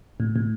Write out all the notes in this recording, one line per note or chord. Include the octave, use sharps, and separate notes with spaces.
A2
A2